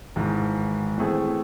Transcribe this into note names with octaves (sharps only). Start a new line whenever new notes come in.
G#1 G#2 E3
A2 E3 A3 C4 G#4